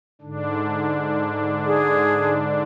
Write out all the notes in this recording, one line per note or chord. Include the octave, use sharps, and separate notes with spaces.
G#2 D3 D4
G#4